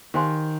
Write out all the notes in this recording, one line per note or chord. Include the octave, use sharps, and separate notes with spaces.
D#3 G4 C5 F5 G#5 C6